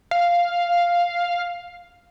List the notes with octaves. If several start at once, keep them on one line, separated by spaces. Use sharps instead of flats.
F5